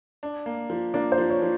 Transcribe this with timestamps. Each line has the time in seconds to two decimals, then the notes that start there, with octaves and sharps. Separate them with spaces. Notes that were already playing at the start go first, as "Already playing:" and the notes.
0.23 D4
0.46 A#3
0.70 F3
0.94 A#3 D4 D5
1.12 C5
1.18 F3
1.30 C#5
1.42 F3